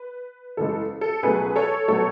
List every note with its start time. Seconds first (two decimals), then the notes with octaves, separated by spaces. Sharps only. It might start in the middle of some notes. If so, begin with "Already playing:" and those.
Already playing: B4
0.57 F#1 E2 C#3 G#3 A4
1.01 A4
1.23 C#2 B2 F#3 A3 G#4 B4
1.56 A4 C#5
1.88 B2 F#3 A3 A4 C#5